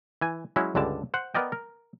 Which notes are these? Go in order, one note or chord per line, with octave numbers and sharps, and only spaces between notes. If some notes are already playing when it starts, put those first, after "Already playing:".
E3 G#5
F#3 G#3 C#4 E4
C#2 G2 D3 D5 A5
C5 F#5
B3 A#4 D5 D#5 G5
A#4